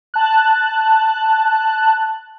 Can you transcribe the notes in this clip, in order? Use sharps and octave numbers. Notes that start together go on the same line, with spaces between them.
A5 F#6